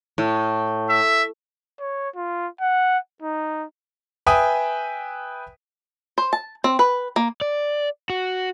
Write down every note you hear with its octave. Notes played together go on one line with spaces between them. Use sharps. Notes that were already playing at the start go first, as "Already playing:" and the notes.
A2
E5
C#5
F4
F#5
D#4
B4 E5 G5 G#5 D#6
C5
A5
C4
B4
A#3
D5
F#4